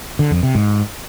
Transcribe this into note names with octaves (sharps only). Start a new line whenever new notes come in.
D3
F2
C3
G#2